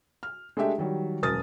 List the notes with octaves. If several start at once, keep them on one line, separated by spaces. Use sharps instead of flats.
F6
G#3 A3 D4 G4 E5
D#3 F#3 G3
E1 F#2 A#4 D#6 F6 A6